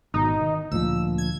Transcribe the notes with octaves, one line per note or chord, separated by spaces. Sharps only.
G#1 B2 D#4
D#3
D2 A#2 F3 E6
G#6